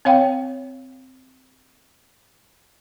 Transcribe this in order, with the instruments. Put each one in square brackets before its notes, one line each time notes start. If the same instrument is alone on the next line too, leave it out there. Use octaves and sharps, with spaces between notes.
[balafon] C4 C#5 F5 G5